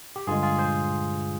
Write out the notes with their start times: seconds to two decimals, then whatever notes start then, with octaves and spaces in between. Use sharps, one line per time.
0.16 G4
0.27 G2 D3 G#3 F4 G#4
0.43 F4 G#4
0.58 G#4 C5